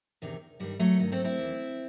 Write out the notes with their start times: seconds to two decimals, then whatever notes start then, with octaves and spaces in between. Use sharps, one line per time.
0.22 E2 C3 D#3
0.60 G2 D#3 G3
0.79 F#3 A3
0.99 G2 D#3
1.12 A3 C4
1.24 C4 E4
1.38 E2 D#3